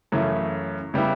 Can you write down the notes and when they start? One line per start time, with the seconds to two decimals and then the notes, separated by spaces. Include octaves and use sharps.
0.12 F#2 C#3 E3 A3
0.94 C#3 G3 B3 E4